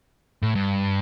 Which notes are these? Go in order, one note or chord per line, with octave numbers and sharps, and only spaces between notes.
A2
G2